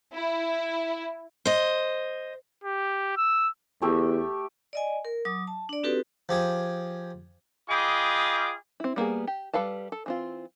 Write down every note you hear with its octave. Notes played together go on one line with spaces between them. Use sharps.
E4
C5 D#5
G4
E6
E2 A3 G4 E5
D5 D#5 G#5
A#4
F#3 D6 D#6
A5
D4 D5
C4 D#4 F#4 G4 A4 B4
F3 G4 G#4
F4 G#4 D#5 G5 B5 D6
C4 E4
G3 A#3 B3 G#4
G4
G3 A4 B4 F5 A5
A4
E3 C4 F4